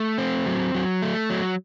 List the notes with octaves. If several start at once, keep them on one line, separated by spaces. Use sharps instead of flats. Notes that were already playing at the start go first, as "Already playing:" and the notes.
Already playing: A3
C4
F#3
F#3
A3
F#3